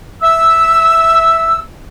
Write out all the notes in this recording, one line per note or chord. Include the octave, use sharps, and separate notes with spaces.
E5 E6